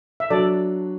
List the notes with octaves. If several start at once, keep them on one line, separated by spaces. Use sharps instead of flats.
E5
F#3 D4 F#4 A4 D5